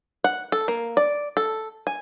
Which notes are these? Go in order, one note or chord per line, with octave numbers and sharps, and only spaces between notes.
F#5
A4
A#3
D5
A4
G#5